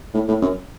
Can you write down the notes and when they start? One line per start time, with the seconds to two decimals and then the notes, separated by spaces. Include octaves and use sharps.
0.14 A2
0.29 A2
0.42 F#2